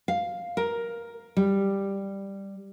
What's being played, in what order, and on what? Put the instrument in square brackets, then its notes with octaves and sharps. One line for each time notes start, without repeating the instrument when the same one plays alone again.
[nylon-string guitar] F5
A#4
G3